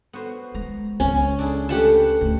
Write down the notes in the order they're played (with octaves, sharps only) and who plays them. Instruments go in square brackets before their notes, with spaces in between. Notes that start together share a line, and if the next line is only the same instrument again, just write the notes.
[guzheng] B3 F#4 C5
[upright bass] G#3 [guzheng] A#5
[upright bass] C#2 [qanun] C#4
[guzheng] D4 E4 G#4
[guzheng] F#2 A3 B4 [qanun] G4 F#5 A5
[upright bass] D2